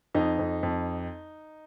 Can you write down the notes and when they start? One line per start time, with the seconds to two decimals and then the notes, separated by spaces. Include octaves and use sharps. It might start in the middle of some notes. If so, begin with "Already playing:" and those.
0.14 F2 D#4
0.39 F2
0.63 F2